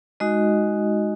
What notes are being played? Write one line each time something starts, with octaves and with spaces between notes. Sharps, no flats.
G#3 D#4 F#4 D#5